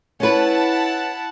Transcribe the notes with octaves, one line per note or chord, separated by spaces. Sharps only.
C#4 E4 B4 F#5 A5